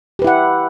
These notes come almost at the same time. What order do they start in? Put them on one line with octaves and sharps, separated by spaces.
G4 B4 E4 F#5